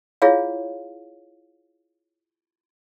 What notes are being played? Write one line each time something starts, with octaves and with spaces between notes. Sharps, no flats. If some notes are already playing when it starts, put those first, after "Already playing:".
E4 F4 G#4 C#5 F5